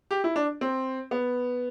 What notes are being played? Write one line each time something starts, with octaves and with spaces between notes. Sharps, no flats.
G4
E4
D4
C4
B3